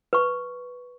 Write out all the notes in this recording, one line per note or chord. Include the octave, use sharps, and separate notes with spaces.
B4 C#6